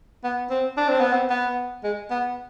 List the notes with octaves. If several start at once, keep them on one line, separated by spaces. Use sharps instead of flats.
B3
C4
D4
C4
B3
C4
B3
G#3
B3